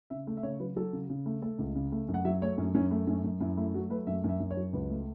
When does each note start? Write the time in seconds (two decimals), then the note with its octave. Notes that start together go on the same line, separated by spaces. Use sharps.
0.10 C#3 E5
0.27 A3
0.37 E5
0.43 C#3 C#5
0.60 F#3 B4
0.76 F#3 A4
0.93 C#3
1.10 C#3
1.26 A3
1.42 A3 A4
1.59 C#2
1.75 C#3
1.92 A3
2.08 F#2
2.14 F#5
2.25 F#3 E5
2.42 A3 C#5
2.58 F#2 C#4
2.75 F#2 C#4
2.91 A3
3.07 F#2 C#4
3.24 F#2
3.41 F#2 E4
3.57 A3 E4
3.74 F#3 F#4
3.90 A3 B4
4.07 F#2 E5
4.24 F#2 E5
4.40 F#2
4.51 C#5
4.57 F#3
4.73 C#2 B4
4.90 A3